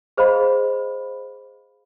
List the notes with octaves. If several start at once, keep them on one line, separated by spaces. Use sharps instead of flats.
G#4 C5 D#5 F5 B5